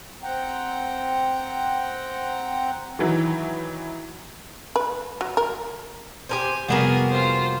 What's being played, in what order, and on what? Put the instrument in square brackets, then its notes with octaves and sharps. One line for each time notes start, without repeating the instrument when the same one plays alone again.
[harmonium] C4 F#5 G5 A#5
[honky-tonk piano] D#3 E3 F#3
[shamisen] B4
F#3
A#4
[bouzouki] G4 A#4 C5 [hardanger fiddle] G#5
[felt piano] F1 G3 E7 [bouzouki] A#3 B3 F#4 [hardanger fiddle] G#4 A#4
[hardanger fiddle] F4 C5